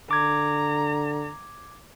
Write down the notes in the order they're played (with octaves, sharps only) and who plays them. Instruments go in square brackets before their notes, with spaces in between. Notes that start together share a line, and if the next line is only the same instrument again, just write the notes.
[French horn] D3 [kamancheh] A#5 [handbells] D6 G#6